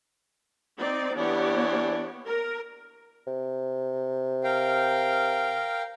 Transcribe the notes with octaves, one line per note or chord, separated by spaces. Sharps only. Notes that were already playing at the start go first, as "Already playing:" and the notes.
C4 D#4 D5
E3 B3 D4 G4 C#5
A#4
C3
A#4 F5 G5